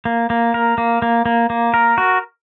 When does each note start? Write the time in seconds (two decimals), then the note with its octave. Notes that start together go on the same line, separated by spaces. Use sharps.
0.05 A#3
0.30 A#3
0.54 A#4
0.78 A#3
1.02 A#3
1.26 A#3
1.50 A#3
1.74 A#4
1.98 F#4